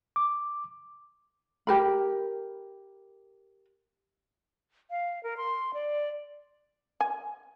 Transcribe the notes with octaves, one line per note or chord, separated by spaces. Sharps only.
D6
G4 A#4 B5
F5
A#4
C6
D5
G#5